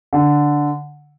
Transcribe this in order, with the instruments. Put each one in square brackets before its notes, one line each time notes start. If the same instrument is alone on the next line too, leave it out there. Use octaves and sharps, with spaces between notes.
[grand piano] D3